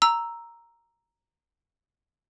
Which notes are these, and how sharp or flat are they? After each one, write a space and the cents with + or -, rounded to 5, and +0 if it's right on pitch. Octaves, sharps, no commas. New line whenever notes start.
A#5 +0 E6 +0